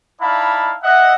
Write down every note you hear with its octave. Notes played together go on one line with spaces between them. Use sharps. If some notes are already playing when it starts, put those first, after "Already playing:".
D#4 E4 D5 F5 A5 B5
D#5 E5 F#5